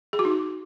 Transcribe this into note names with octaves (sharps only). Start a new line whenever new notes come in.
G#4
F#4
D#4